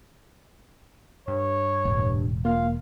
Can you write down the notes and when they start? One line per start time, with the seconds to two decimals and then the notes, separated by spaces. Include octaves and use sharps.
1.28 G2 C#5
1.85 E1 A2
2.45 A#3 F4 F5